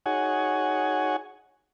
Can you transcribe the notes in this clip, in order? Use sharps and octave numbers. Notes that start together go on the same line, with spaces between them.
D#4 F#4 G#4 C#5 F#5 G#5